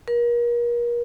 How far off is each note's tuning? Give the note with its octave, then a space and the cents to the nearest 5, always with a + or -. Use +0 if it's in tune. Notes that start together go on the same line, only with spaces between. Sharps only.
A#4 +35